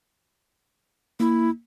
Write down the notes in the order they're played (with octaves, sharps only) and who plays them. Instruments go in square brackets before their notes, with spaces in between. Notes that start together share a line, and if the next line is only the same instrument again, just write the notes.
[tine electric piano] A#3 [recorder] E4